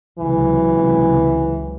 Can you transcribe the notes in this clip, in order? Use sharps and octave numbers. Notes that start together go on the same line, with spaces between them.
C#2 C3 E3 F#3